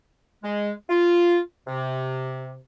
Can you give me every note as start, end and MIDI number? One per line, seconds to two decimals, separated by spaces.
0.43 0.71 56
0.90 1.39 65
1.67 2.58 48